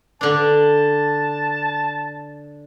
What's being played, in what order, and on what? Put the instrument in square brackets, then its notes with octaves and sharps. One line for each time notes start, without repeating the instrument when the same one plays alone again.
[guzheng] D3 D4 [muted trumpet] A5